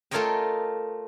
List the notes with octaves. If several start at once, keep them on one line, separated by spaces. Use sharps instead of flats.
A3 F4 A#4 C#5 D#5 G5